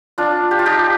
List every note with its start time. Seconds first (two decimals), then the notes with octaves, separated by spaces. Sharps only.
0.18 D4 F4
0.51 G4
0.59 F4
0.66 D#4 G4